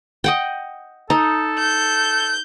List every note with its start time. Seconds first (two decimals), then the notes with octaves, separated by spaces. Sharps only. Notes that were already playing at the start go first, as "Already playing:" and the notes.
0.24 D#5 F#5 G5
1.10 D#4 A4
1.59 G6